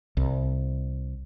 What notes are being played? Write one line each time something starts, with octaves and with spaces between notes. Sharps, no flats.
C2